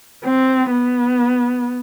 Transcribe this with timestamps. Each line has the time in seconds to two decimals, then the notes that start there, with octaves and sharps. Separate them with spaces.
0.24 C4
0.71 B3